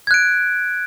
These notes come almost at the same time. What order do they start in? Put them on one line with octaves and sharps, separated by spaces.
G#6 F#6 D7